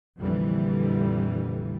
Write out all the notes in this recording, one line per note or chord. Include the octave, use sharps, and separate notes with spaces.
A#1 F2 D3 E3 G3